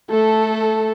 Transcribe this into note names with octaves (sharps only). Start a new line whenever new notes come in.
A3 A4